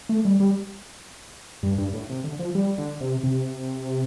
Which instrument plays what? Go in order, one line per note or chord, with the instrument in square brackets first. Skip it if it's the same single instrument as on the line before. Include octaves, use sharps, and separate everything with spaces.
[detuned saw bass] A3
G3
G3
G2
G2
A2
C3
D3
F3
G3
D3
C3
C3